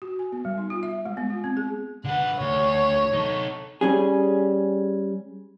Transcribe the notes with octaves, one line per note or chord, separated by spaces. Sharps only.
F#4
G#5
B3
G3
D#4
F4
E5
G#3
B3
F4
C4
G#4
D3 B4 F#5
D2 C#5
D#4 A4
G3 C#4 G#4